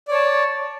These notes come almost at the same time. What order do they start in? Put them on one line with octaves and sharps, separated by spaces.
D5 C#5 A5